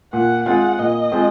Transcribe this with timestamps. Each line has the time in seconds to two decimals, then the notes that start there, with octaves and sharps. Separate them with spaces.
0.13 A#2 F#5
0.46 G#3 C4 F4 F#5
0.79 A#2 D#5
1.12 G#3 C4 F4